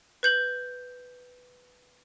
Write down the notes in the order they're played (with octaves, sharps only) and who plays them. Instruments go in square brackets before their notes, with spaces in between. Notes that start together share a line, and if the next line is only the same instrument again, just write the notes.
[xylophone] B4 G6 F#7